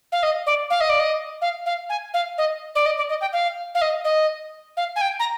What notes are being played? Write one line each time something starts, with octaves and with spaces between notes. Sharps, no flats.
F5
D#5
D5
F5
D#5
D5
D#5
F5
F5
G#5
F5
D#5
D5
D#5
D5
D#5
G5
F5
F5
D#5
D#5
F5
G#5
G5
A#5